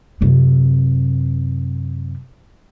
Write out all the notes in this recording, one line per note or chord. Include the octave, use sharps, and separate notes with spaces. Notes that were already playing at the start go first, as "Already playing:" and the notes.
F#2 C3